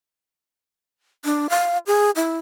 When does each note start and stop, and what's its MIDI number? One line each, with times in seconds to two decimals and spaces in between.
1.25 1.47 62
1.50 1.78 77
1.87 2.11 68
2.16 2.37 64